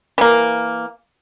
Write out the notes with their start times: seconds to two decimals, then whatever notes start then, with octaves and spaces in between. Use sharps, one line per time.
0.18 E3 A#3